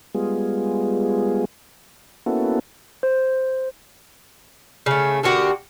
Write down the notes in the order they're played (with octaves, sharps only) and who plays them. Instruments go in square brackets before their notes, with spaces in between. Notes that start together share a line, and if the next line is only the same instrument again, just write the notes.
[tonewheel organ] G3 G#3 B3 F4 G#4
A#3 B3 C#4 E4 F#4 A4
[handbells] C5
[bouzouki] C#3 A3
D3 A#3 F#4 G4